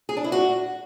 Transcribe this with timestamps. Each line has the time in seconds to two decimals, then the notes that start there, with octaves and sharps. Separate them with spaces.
0.09 G#4
0.17 D4
0.24 E4
0.32 F#4